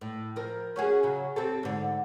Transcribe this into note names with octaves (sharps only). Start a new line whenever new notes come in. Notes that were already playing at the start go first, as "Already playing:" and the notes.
A2
F3 A#4
C#4 F#4 G#4
C#3 F#3
C4 G4 A4
G#2 D3